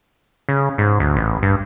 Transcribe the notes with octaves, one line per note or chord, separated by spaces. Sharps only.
C#3
G#2
D2
A1
G2